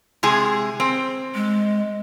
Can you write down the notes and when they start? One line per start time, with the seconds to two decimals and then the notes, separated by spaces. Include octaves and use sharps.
0.23 C3 G#3 G#4
0.80 C4
1.35 G#3